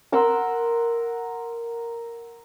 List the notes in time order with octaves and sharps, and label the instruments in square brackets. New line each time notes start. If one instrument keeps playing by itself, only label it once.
[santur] A#4 F#5 C6 E6